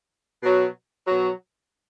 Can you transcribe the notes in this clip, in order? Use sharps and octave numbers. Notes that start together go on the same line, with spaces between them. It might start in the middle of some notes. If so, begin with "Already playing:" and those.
B2 F#3
B2 F#3